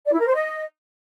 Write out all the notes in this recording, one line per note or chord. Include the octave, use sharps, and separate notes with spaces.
D5
E4
A#4
C5
D#5